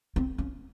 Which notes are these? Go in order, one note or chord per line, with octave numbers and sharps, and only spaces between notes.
C4
C#4